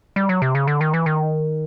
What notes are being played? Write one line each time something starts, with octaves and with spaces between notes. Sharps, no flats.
G3
F#3
C3
C#3
D3
D#3
E3
D#3